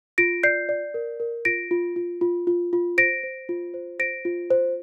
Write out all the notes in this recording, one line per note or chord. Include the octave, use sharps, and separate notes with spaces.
F4 A#6 D7
D5 G6 C7
D5
A#4
A#4
F4 A#6 D7
F4
F4
F4
F4
F4
C5 A#6 D7
C5
F4
C5
C5 A#6 D7
F4
C5